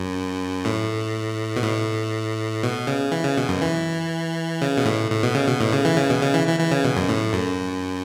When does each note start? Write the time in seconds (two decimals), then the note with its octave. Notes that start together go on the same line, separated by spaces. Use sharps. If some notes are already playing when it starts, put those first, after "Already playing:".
Already playing: F#2
0.65 A2
1.56 B2
1.63 A2
2.63 B2
2.87 C#3
3.12 E3
3.24 C#3
3.37 B2
3.49 F#2
3.62 E3
4.62 C#3
4.77 B2
4.85 A2
5.11 A2
5.23 B2
5.35 C#3
5.48 B2
5.61 A2
5.73 C#3
5.85 E3
5.97 C#3
6.10 B2
6.22 C#3
6.34 E3
6.47 E3
6.59 E3
6.71 C#3
6.85 B2
6.96 F#2
7.09 A2
7.33 F#2